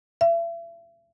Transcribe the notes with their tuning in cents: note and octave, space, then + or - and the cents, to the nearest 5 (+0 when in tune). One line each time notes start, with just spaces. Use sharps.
E5 +40